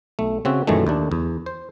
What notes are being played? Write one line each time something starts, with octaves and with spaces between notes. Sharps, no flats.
B1 A3
C#3 C4 F#4 E5
F#2 A#2 D#3 E3 G#3 A3
D#2 A3 D4
E2
C5